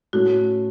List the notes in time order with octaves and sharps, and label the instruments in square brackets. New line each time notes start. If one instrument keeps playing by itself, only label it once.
[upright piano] A2 A3 C#4 [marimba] F#4